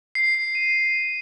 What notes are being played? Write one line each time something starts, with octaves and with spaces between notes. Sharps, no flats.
C7
C7
D#7